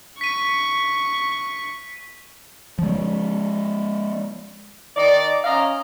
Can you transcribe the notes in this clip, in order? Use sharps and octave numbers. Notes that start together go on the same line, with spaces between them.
C#6 B6 D#7
F3 G#3
D#3 D#4 D5
C#4 D#5 F5 A#5